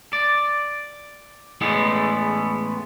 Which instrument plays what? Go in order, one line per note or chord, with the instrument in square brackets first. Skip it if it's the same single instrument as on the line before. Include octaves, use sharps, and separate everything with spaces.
[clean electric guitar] D5
E2 A2 G#3 A3 B3 C#4